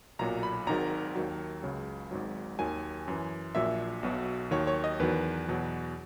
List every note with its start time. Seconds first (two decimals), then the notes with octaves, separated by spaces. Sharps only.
0.19 B1 A#2 F#3 A#5
0.43 B5
0.67 G#1 G#2 D#3 F#3 A#5
1.16 D#2 D#3 F#3
1.63 C#2 C#3 F#3
2.11 G#1 G#2 F#3
2.59 D#2 D#3 F#3 G#5
3.08 F#2 E3
3.55 A#1 A#2 F#3 E5
4.03 B1 B2 F#3
4.51 D#2 D#3 F#3 C#5
4.67 C#5
4.84 D#5
4.99 E2 D#3 F#3 B4
5.48 E2 B2 F#3